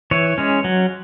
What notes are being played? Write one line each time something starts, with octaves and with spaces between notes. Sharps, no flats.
E3 C#5
G#3 C#4
F#3